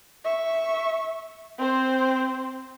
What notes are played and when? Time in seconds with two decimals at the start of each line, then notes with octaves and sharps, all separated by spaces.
0.24 E5 C#6
1.58 C4 C5